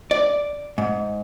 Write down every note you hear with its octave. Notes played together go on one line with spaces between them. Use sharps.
D5
G#2